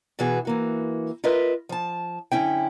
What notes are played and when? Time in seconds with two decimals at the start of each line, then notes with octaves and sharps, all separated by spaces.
0.19 B2 E3 B3 F#4 G#4
0.45 E3 A#3 F#4
1.24 F4 A#4 B4 D#5 E5
1.69 F3 A5
2.32 F#2 D3 C4 C#4 E4 G5